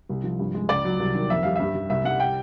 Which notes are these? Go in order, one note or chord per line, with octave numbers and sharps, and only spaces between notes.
C2
F3
G2
G#3
C#2 D5
F#3
C2
D#3
F2 E5
G3 F5
G2 E5
G3
C2 E5
G3 F#5
G5